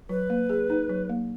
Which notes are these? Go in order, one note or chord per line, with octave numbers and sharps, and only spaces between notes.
F#3 B4
A#3
G#4
D#4
F#3
A#3